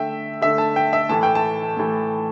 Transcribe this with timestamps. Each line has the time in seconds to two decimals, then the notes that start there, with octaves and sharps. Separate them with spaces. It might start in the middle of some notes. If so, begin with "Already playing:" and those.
Already playing: D3 A3 E5 G5
0.42 D3 A3 E5
0.58 A5
0.76 G5
0.93 E5
1.09 A2 E3 A3 A5
1.23 G5
1.35 A5
1.77 A2 E3 A3